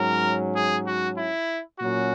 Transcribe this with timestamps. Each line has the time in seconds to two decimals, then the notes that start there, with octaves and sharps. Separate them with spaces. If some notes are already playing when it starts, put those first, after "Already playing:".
Already playing: G#2 F#3 C#4 A#4
0.55 G#4
0.86 F#4
1.17 E4
1.79 A#2 F#3 C#4 F#4